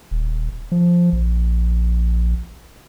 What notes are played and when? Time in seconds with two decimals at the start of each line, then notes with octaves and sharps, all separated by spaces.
0.11 D#1
0.72 F3
1.13 A#1